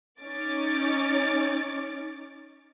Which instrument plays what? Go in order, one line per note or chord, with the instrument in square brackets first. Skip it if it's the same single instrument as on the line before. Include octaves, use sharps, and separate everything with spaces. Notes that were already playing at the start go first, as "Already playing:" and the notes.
[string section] C#4 D#4 C#5 D6 A6